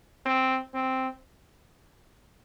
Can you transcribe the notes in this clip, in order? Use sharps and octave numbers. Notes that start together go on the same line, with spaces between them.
C4
C4